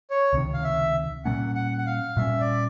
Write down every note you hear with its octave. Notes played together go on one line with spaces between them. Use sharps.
C#5
C#2 C3 D#3
F5
E5
A#2 G3 A#3 C#4 F#5
F#5
F#5
F5
A#2 G3 A#3 C#4 E5
D5